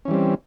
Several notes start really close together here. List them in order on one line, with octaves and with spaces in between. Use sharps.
C#4 E3 G3 C4